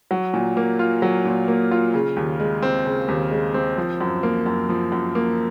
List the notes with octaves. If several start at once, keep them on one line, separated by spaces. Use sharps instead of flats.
F#3
A#2
A#3
F4
F#3
A#2
A#3
F4
C#3
D#2
G#3
C4
C#3
D#2
G#3
C4
F3
F#2
A#3
F#2
F3
F#2
A#3